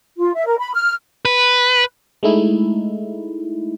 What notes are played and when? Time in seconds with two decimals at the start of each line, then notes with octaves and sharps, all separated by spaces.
0.18 F4
0.35 E5
0.47 A#4
0.60 B5
0.75 F6
1.25 B4
2.23 G#3 A3 D#4 E4